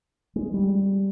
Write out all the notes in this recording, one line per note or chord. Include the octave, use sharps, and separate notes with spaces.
G#3
G3